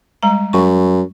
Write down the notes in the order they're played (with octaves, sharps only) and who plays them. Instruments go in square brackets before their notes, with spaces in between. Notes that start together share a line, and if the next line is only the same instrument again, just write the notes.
[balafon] G3 G#3 A#5
[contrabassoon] F#2 [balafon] C#6